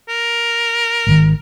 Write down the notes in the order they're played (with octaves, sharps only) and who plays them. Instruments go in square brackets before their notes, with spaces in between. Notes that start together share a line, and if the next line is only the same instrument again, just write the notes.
[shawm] A#4
[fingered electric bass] G#1 D3 D#3